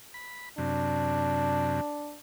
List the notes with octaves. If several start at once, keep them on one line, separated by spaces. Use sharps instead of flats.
B5
F#2 C3 D4